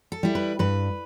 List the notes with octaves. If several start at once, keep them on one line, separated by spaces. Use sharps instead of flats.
A4
G3 E4
B4
G2 B4